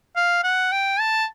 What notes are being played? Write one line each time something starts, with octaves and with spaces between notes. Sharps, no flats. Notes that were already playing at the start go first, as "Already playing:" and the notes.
F5
F#5
G5
A5